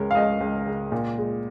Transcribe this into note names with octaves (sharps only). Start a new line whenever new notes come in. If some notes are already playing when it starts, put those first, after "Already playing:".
Already playing: C#2 C#3 G#3 A#4 C#5
F5
C#2 D#5
C#2
C#3
A#2
G#3